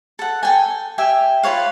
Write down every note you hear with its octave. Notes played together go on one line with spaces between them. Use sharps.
A4 F#5
A4 G5 G#5
G4 E5 G5 G#5
F4 B4 C#5 F5